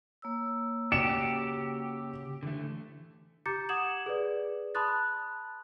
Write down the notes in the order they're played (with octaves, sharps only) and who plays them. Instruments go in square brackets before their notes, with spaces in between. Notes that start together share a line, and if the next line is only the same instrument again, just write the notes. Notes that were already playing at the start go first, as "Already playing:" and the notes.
[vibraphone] A#3 C#5 E6
[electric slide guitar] C#3 F#4 [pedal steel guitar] G4 [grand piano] C#7 E7
[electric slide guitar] D3 E3 A3
[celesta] G4 A#5 D6 G6 A6 C#7
F#5 D6 D#6 G#6 E7 F#7
G#4 B4 D5
A5 B5 C6 D#6 F#6 A6